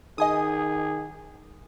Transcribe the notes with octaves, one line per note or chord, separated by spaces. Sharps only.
D#3 G#4 D#5 G#5 D#6